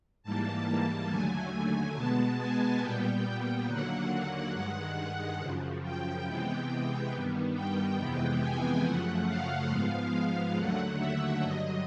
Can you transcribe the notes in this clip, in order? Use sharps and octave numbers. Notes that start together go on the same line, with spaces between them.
G#2 E3 G3 A#3 A5
D#2 D3 F#3 A3 G#5
B2 G#3 B3 A5
G#5
A#2 G3 B3 G5
D#2 D3 F#3 A#3 F#5
F#5
G2 D#3 G#3
F#2 C#3 F3
G5
C3 E3 G#3 B3
G2 D#3 G3 B3
G5
F2 C3 E3 G#3 B3
G#5
F#2 C#3 F3 A3 F#5
F5
G#2 F3 G#3 B3
D#2 D3 F#3 A3 F#5
E5
G2 D3 F#3 D#5